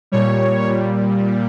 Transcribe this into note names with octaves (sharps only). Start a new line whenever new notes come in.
A#2 G3 C#5
A#2 G3